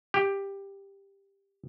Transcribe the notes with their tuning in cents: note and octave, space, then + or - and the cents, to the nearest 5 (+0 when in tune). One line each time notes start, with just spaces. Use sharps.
G4 +10